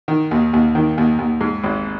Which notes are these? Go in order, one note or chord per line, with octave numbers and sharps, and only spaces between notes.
D#3
D#2
D#2
D#3
D#2
D#2
G#2
G#1